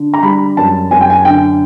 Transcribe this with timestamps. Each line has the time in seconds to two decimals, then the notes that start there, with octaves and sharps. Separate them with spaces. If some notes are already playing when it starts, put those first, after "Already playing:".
Already playing: D3
0.14 A#5
0.23 G3 B5
0.57 F#2 A5
0.91 F#2 G#5
1.01 G5
1.10 G#5
1.25 D3 G5